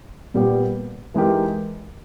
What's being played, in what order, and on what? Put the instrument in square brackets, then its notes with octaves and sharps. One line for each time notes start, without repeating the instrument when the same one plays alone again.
[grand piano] A#2 G3 B3 G4
E3 G#3 D#4 G4 A#4